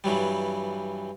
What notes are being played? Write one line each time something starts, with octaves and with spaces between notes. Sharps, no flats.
G2 E3 F#3 G3